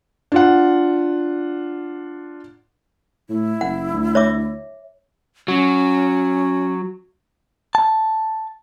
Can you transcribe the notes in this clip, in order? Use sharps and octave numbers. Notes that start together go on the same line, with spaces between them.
D4 F4 F#5
A2 E4
F#1 F#5
D2
C#5 E5 D6
F#3 C#4
A5